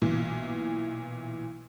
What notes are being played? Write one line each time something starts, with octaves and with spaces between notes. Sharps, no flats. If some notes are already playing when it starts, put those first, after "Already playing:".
B1 A#2 E3